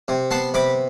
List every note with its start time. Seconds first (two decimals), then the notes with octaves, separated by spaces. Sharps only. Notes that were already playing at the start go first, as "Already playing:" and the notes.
0.08 C3
0.31 B3 A5 C6
0.54 C3 B5 D6